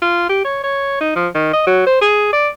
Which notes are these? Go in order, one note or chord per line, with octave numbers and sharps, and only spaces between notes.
F4
G4
C#5
C#5
D#4
F3
D#3
D#5
F#3
C5
G#4
D5